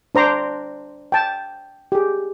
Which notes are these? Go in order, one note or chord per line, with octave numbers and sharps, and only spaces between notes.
D4 C5 A#5 C6 D6
G5 A5
G4 G#4